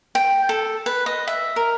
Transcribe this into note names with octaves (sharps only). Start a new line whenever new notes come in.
G5
A4
B4
D#5
E5
A#4